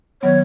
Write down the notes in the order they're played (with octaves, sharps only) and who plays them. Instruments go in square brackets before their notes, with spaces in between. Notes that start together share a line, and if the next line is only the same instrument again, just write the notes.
[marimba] D#3 F#3 B3 [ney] C#5